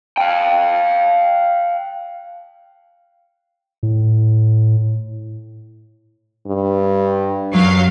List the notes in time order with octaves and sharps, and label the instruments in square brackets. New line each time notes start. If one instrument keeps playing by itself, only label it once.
[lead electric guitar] F5 G5
[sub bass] A2
[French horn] G2
[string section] F#2 F#3 F5